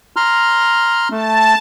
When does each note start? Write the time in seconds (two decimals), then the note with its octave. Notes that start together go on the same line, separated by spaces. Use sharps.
0.16 A#5 C6 F6
1.11 A3 A5